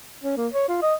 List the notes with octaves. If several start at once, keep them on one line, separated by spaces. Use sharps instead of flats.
C#4
A#3
C#5
F4
D#5